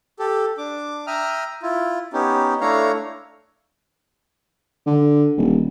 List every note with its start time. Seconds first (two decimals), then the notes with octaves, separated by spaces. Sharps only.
0.19 G4 A4
0.58 D4 D6
1.07 E5 G5 A#5 D#6 F6
1.63 E4 F4
2.13 B3 C#4 D#4 G4
2.61 A3 D4 E4 C#5 F5 A#5
4.86 D3
5.38 D#1